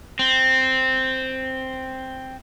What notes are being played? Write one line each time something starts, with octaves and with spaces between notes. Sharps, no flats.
C4